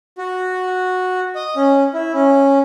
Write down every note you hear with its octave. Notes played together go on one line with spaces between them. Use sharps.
F#4
D#5
C#4
E4
C#4